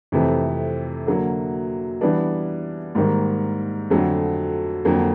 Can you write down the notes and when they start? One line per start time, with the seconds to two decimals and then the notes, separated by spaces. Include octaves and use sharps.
0.12 F2 C3 E3 A3
1.07 D3 F#3 A#3
2.01 E3 G3 B3 D4
2.95 G#2 D#3 G3 A#3
3.90 F2 D3 F#3 A3
4.85 F2 D3 F#3 A#3